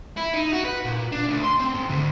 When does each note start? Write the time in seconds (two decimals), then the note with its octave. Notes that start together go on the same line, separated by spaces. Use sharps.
0.17 E4
0.34 D#4
0.52 F#4
0.65 B4
0.85 A#2
1.12 D4
1.27 D2
1.43 C6
1.59 C4
1.75 G#2
1.90 D2